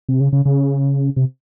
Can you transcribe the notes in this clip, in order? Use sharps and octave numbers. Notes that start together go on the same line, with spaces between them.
C3
C#3
C#3
C#3
C3